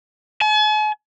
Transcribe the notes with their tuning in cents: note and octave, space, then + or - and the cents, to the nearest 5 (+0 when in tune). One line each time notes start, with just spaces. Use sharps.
G#5 +45